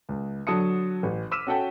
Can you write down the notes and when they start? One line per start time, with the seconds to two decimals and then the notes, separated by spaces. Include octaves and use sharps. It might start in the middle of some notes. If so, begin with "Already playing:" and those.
0.09 C#2
0.47 D3 F#3 A5 D#6 C#7
1.03 A1
1.31 D6 E6 F6 B6 D#7 E7
1.47 C#4 F#4 A4 F#5 G5 A5